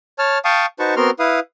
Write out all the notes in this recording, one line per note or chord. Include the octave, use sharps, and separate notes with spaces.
C#5 A5 F6
F5 G5 A5 C#6 D#6
D#4 F#4 B4 C5 A5 C#6
B3 C4 F#4 A#4 C6 F6
E4 B4 F5 D#6